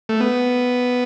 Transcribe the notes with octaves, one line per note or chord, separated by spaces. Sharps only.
A3
B3